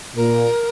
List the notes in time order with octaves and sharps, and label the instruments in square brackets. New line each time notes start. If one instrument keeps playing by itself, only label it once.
[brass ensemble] A#2 [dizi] A#4